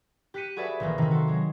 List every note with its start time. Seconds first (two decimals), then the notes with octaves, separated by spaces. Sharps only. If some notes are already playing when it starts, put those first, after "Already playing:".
0.34 G4 F#6 B6 C#7 D#7
0.56 F#4 G#4 A4 B4 D5 E5
0.80 A#1 D#3 E3 A#3
0.98 C3 D#3 A3
1.11 F#4 A4 C6
1.27 F#3 G#3